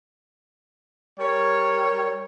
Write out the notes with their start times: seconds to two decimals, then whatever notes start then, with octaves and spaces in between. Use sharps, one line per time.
1.19 G3 A#4 C#5